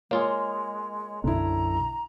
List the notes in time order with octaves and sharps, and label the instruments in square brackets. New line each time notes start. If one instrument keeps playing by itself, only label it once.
[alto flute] G#3 [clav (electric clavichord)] A#3 F4 G#4 [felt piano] C#5
[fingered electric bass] B1 F#2 [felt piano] D3 E4 [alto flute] A#5